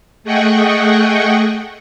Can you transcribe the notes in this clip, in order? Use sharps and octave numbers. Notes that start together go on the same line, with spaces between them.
A3 G#4 D#5 F#5 G5 C#6